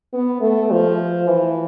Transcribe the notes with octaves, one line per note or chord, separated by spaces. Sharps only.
B3
A3
F3
E3